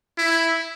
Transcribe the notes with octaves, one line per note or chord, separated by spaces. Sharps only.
E4